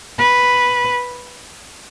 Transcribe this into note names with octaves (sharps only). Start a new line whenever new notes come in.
B4